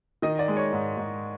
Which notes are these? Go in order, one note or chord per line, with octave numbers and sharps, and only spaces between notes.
D#3 D#5
D5
G#3
C#5
G#2
G#2